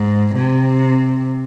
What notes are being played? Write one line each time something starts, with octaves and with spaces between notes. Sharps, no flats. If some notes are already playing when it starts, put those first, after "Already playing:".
Already playing: G#2
C3